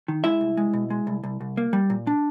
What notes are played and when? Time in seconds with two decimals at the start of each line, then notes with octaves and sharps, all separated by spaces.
0.08 D#3
0.24 G#3 E4 E5
0.41 C2
0.57 G#3
0.73 B2
0.90 G#3
1.07 C2
1.24 C2
1.41 C2
1.57 A#3
1.73 G3
1.90 A#2
2.07 D4